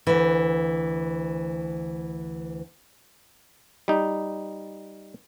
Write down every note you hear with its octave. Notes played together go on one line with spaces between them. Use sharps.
D2 E3
G3 D#4